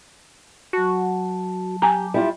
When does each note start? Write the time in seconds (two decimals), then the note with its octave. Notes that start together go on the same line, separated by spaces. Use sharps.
0.73 F#3 F#4 A5
1.82 G4 G#5 A#5
2.14 G3 E4 F4